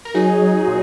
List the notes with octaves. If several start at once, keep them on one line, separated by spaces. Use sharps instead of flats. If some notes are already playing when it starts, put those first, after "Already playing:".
A#4
F#3 D#4 G#4
F#3
A#2